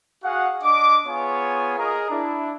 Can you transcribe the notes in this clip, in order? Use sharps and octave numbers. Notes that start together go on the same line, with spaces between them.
F#4 G#4 F5 F#5
D4 D#5 D6
B3 F4 G#4 C#5 G#5
G#4 A#4 D#5 A#5
D4 E4